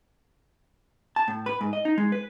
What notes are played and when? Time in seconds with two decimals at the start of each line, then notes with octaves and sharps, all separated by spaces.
1.16 A5
1.28 A2
1.46 B4
1.61 G#2
1.73 D#5
1.85 D#4
1.98 G#3
2.12 B4